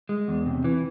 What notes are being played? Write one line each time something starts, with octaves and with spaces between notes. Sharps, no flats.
G#3
E2
C3
E3